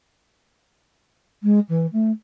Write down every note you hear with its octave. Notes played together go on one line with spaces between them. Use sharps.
G#3
E3
A3